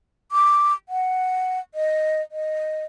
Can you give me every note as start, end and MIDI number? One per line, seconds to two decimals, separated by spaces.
0.32 0.73 86
0.89 1.59 78
1.75 2.21 75
2.32 2.85 75